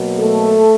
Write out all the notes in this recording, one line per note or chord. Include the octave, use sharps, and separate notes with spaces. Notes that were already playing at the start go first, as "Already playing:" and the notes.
Already playing: B2 F#3 A#3
A3 A4